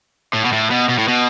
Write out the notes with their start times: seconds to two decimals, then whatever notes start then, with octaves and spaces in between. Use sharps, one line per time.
0.33 A2
0.45 B2
0.52 A2
0.70 B2
0.89 B2
0.98 A2
1.08 B2